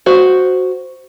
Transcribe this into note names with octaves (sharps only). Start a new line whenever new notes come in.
F#4 C5